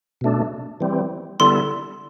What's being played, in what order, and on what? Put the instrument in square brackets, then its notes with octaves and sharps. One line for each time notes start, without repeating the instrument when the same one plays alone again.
[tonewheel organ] B2 A3 D4
E3 G3 C4
[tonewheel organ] D3 G3 B3 E4 A4 [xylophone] C6